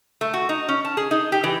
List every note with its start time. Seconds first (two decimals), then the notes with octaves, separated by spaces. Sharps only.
0.21 A3
0.34 F#4
0.49 D#4
0.69 C#4
0.85 A5
0.97 G#4
1.11 D#4
1.32 G4
1.44 E3